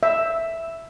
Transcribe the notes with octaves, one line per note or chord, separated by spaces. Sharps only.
E5